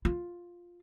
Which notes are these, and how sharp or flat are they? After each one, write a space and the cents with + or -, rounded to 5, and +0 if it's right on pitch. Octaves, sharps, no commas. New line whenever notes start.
F4 +5